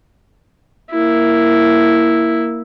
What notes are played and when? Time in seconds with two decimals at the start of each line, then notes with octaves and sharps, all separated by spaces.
0.91 A#3 E4